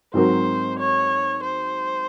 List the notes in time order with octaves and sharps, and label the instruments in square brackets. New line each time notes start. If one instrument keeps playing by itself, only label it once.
[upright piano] G#2 F#3 C4 F#4 A#4 [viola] C5
[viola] C#5
C5